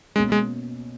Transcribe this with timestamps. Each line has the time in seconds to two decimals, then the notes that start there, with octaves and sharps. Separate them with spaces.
0.16 B2 G#3 A#3 C#4
0.32 G#3